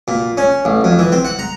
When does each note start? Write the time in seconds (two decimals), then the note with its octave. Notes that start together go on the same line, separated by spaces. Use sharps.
0.08 A#2
0.37 C#4
0.65 A1
0.84 F2
0.99 E3
1.12 C4
1.25 F#5
1.39 A#5